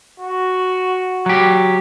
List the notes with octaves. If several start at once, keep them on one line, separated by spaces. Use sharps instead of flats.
F#4
F#3 G4